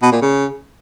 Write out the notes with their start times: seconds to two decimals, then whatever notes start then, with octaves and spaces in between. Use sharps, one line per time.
0.02 B2
0.12 A#2
0.22 C#3